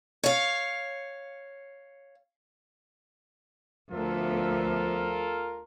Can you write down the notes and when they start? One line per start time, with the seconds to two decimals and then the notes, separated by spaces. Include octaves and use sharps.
0.24 C#5 F5
3.91 D2 F3 B3 F4 A4 A#4 E5